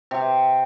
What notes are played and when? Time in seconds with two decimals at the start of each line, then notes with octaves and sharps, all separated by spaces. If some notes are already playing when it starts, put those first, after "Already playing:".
0.11 C3